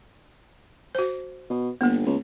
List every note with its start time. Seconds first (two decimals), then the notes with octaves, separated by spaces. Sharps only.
0.95 F#4 C5
1.50 B2
1.81 G1 A#3 B3
2.06 C#2